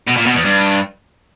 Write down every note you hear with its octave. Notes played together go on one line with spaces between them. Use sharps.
B2
A#2
B2
E2
G2